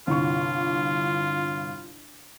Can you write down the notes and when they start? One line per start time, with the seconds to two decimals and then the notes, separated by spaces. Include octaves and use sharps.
0.07 G1 C2 F4 C#6